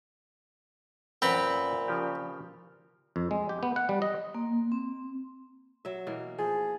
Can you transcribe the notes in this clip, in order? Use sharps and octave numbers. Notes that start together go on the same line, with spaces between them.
F#2 A#2 C4 B4 D5 F#5 B5
C#3 F3 G4
F2
G#3
G4
B3
F#5
G3
D#5
A#3
C4
F#3 E5
B2 E3 A#3
F3 G#4